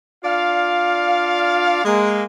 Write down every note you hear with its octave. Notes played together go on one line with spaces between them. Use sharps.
D4 F4 D5 F5
G#3 A#3